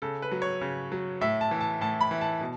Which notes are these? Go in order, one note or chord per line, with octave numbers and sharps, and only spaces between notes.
C#3 A4
B4
F#3
C#5
C#3
F#3
A2 E5
A5
E3
A5
A2 A5
B5
E3
A5
B2